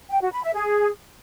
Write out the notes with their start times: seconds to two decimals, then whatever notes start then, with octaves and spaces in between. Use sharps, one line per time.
0.10 G5
0.21 F#4
0.32 B5
0.43 E5
0.54 G#4